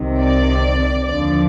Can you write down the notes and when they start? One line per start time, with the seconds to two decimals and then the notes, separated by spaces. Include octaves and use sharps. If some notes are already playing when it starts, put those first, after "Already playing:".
Already playing: C2 C3 D#3
0.20 D5
1.06 D#2 D3 F3 D5